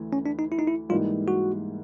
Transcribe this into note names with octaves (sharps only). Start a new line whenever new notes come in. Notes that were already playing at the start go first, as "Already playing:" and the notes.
Already playing: D2 E3 A3
C#4
D4
D#4
E4
D#4
E4
G#2 E3 G3 A#3 D#4 F4
F#4